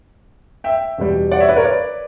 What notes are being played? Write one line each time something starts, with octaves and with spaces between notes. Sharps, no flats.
E5 G5
E2 B2 G3
D5 F#5
C#5 E5
B4 D5
A#4 C#5
B4 D5